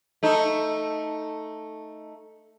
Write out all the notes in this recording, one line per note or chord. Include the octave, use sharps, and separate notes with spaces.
A3 D#4